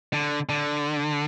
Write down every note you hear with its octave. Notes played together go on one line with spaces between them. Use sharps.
D3
D3